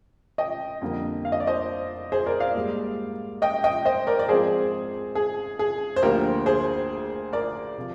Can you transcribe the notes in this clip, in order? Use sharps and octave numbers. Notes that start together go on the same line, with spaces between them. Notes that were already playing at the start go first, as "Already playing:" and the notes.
D#5 G5
F2 D3 G3 A#3
F5
D#5
D5
C5 D#5
G#4 C5
A#4 D5
D5 F5
G#2 G3 A#3
D#5 G5
D#5 G5
C5 D#5
A#4 D5
D5
G#2 F3 G#3 C4 G#4 C5
G#4
G#4
C5
D2 D3 F3 A#3 G4 A#4
G#4 C5
A#4 D5
C3 F3